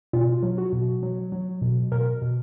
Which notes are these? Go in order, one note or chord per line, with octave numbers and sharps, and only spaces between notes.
B2 F4
F#3
F#4
B2
F#3
F#3
B2
B2 A#4
B2